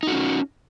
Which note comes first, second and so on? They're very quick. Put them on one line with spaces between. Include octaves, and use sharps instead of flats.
D#4 F#4 C#4